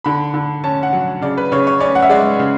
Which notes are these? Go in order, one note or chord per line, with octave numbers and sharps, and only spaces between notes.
D3 B5
D3
C#4 A5
F#5
F#3
C#3 D5
B4
C#3 C#5
C#5
C#4 D5
F#5
E5
G#3 D5
C#3